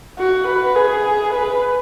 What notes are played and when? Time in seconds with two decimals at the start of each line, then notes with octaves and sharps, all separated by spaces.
0.18 F#4
0.47 B4
0.76 G#4
1.33 B4